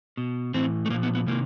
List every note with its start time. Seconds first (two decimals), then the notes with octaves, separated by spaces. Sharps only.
0.17 B2
0.54 A2 E3 C4
0.86 A3
0.90 A#2 A#3
0.94 F3
1.03 B3
1.15 B3
1.27 C3 D#3 A#3